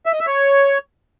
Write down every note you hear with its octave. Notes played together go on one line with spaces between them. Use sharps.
E5
D#5
E5
C#5